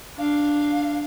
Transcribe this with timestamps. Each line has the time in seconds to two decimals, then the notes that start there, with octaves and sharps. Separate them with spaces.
0.18 D4 F5